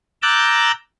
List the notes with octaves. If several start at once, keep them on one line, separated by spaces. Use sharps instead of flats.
A#5 D6 E6 F#6 G6 A6